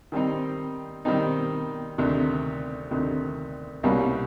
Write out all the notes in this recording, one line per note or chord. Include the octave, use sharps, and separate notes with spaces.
D#3 G3 C4 D#4
D#3 G3 C4 D#4
D2 C3 D#3
D2 C3 D#3
C2 B2 G3 A#3 C#4